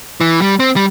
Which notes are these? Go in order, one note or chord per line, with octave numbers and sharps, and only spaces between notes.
E3
G3
C4
G3